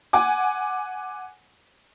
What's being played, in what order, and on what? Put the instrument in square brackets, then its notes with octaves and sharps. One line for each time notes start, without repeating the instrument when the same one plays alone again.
[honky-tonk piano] F#5 G#5 D6